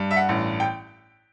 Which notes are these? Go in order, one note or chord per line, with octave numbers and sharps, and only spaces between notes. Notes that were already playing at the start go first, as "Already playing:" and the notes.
Already playing: G2
E5
F#5
A1
G5